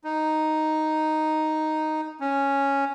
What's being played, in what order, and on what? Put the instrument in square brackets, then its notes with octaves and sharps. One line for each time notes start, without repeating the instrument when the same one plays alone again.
[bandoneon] D#4
C#4